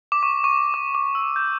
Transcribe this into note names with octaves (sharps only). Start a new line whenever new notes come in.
D6
C#6
C#6
D6
D6
E6
G6